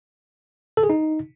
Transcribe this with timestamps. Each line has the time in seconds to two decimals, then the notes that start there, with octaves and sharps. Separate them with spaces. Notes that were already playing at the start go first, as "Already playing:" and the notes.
0.77 A4
0.83 G#4
0.90 D#4